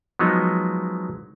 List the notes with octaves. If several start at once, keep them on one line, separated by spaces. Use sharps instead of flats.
F3 F#3 G#3 B3 D#4